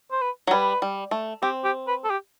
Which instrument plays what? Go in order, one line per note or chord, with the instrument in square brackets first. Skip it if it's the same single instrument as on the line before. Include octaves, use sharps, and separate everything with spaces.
[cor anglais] C5
B4
[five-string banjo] F#3
[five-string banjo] G3 [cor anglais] B4
[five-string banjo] G3
A3
[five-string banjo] C4 [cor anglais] G4
[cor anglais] G4
B4
A4
G4